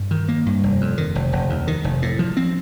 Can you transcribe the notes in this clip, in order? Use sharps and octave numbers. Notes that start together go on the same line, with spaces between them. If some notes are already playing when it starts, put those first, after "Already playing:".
Already playing: G2
D#3
A#3
G2
F1
F2
D#3
F1
F1
D#2
D#3
F1
A2
F3
C4